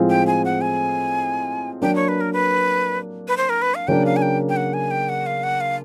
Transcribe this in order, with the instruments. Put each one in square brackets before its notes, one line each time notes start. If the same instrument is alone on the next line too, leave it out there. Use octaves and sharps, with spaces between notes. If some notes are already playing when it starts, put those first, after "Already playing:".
Already playing: [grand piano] A2 F3 G#3 C4 F4
[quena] G5
G#5
F#5
G#5
[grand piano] F#3 A#3 D4 [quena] G5
[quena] C#5
B4
A#4
B4
B4
C5
A#4
B4
F5
[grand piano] C#3 F#3 A#3 D4 [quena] G5
[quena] F5
G#5
G5
G5
F#5
G#5
G5
F#5
F5
F#5
F5